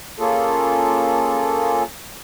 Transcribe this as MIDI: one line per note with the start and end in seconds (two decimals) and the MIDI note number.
0.19 1.83 58
0.19 1.83 61
0.19 1.83 65
0.19 1.83 68
0.19 1.83 69